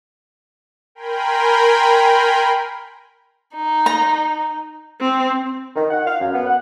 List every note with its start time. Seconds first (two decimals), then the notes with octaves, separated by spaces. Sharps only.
0.95 A#4 G5 G#5 B5 C6
3.55 D#4
3.86 A#5
5.01 C4
5.74 D#3
5.91 F#5
6.05 F5
6.20 F#2
6.33 B3
6.46 F#5